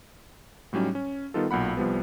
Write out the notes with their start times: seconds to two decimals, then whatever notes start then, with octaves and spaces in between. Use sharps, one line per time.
0.73 A2 F#3 G3 C#4 D#4
0.95 C#4
1.34 D#3 G3 B3 D#4 F4 A4
1.51 B1 A#2 F#5 B5
1.77 C2 F3 G3 B3